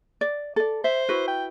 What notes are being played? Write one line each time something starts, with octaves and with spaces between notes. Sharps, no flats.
D5
A4 D5
C5 E5
E4 F#4 B4
G5